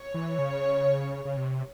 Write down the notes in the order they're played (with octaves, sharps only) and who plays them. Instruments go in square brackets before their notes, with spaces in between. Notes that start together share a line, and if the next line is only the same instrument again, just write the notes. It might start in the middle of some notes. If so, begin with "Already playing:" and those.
Already playing: [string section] C#5
[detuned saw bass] E3
C#3
C#3
C3